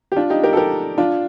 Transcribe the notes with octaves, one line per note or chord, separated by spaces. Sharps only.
G4
D4 F4
D#4 G4
G4 A#4
A4
G4 A#4
D4 F4